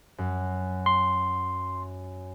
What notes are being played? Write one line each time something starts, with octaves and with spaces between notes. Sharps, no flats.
F#2
C6